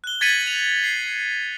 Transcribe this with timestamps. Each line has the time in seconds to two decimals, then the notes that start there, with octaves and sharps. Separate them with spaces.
0.04 F#6 G7
0.21 G#6 A6 B6 C#7 D#7 F#7
0.47 F7
0.80 C7 F#7